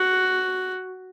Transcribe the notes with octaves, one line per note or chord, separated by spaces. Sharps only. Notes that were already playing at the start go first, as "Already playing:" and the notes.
Already playing: F#4